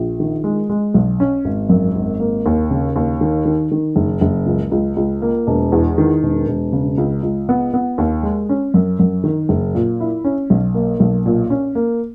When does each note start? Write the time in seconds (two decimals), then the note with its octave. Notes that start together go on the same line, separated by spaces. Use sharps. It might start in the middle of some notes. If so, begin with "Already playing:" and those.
Already playing: A#1
0.20 D#3
0.44 G#3
0.70 G#3
0.94 B1
1.20 C#4
1.45 G#1
1.69 F#2
1.95 G#1
2.20 A#3
2.46 D#2
2.71 C#3
2.96 D#2
3.21 D#3
3.45 D#3
3.71 D#3
3.96 F#1
4.21 F#1
4.46 C#2
4.71 C#2
4.96 C#2
5.22 A#3
5.47 E1
5.72 E2
5.98 D#3
6.23 E1
6.48 E1
6.73 C#3
6.98 C#2
7.23 C#2
7.49 B3
7.74 B3
7.98 D#2
8.23 G#3
8.49 C#4
8.74 F#2
8.99 F#2
9.24 D#3
9.49 F#1
9.75 A#2
10.00 E4
10.24 C#4
10.50 B1
10.74 A#3
11.00 B1
11.26 A#2
11.50 C#4
11.75 A#3